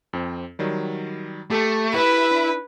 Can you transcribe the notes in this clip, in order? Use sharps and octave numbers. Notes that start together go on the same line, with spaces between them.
F2 C4
D#3 F#3 G3
A3 G4 A4 A5
E4 B4
D4